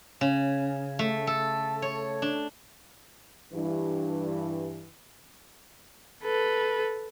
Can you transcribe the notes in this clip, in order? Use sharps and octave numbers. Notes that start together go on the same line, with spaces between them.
C#3
A3
A4
C#5
D4
G2 E3
A4 B4